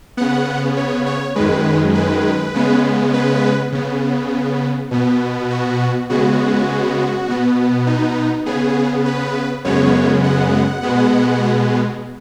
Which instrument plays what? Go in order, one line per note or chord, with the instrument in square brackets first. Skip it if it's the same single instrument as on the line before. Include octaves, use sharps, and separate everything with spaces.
[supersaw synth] C#3 B3 F#5
C#5
C#5
F#2 D#3 G#3 B4
B4
C#3 G#3 B3
B4
C#3 B3
B2 B3
F#4
C#3 G#3 B3 F#4
B2 B3
D#4
C#3 B3 G#4
B4
F#2 C#3 G#3 B3 C#5
F#5
B2 G#3 B3